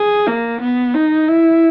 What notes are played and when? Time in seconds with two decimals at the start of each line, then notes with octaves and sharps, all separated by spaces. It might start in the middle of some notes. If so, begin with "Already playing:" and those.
Already playing: G#4
0.27 A#3
0.60 B3
0.94 D#4
1.28 E4